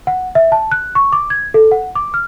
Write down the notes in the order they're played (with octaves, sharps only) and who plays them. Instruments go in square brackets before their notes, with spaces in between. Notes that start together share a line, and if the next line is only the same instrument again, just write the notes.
[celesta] F#5
E5
A5
F#6
C#6
D6
G#6
A4
F#5
D6
F6